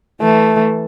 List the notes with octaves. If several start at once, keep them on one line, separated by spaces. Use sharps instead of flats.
E3 A3